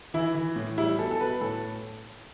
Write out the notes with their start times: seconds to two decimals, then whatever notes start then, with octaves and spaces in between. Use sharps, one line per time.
0.14 E3 E4
0.35 E3
0.56 A2
0.78 G3 E4
0.99 B2 A4
1.11 A4
1.20 B2 B4
1.41 A2 A4